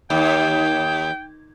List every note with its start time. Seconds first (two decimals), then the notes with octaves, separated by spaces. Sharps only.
0.10 D#2 G5